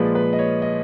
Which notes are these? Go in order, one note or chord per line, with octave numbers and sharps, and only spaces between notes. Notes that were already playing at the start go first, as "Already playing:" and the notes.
Already playing: A#2 F3 G#3 B4
B4
D#5
C#5
D#5